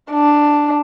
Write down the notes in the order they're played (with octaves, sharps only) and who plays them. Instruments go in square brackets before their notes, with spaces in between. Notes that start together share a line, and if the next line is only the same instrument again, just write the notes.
[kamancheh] D4